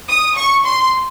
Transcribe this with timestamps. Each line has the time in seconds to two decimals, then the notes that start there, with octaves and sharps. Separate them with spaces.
0.08 D#6
0.36 C#6
0.65 C6